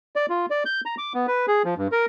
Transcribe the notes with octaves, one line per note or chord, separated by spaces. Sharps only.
D5
F4
D5
G6
A#5
D6
B3
B4
G#4
F3
G2
A#4